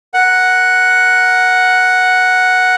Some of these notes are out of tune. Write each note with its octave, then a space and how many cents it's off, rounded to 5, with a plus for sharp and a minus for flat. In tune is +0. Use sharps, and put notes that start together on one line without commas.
A#4 +0 F#5 +0